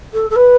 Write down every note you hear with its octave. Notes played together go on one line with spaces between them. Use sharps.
A4
A4
B4